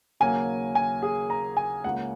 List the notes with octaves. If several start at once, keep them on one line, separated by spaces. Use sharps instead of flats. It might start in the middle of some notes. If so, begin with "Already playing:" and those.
D#2 C#3 F#3 A#3 G#5
G#5
G#4
A#5
G#5
C#2 C#3 A#3 F#5